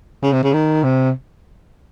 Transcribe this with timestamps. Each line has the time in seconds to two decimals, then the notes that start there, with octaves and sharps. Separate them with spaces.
0.23 C#3
0.33 C3
0.43 C#3
0.54 D#3
0.84 C3